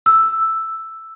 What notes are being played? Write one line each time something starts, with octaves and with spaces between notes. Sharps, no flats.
E6